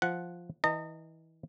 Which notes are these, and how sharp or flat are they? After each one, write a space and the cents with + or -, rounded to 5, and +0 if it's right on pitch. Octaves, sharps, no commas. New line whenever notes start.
F3 +0 F#5 +0
E3 -30 D#5 -15 A#5 -45